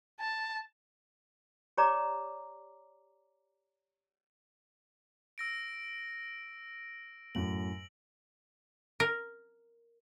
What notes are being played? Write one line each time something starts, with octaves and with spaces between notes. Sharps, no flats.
A5
G4 C#5 D5 A#5 D6
E6 A#6 D7
F#2 A2 F#7
A#4